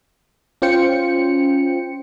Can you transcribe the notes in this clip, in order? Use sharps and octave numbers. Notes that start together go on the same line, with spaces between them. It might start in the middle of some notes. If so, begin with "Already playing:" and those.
C#4 F4 C5 G5 C#7